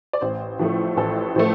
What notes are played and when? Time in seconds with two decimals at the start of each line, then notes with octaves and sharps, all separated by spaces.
0.13 D5
0.21 A1 C5
0.59 A2 F3 A3
0.97 A1 A4
1.35 A2 F3 A3 C5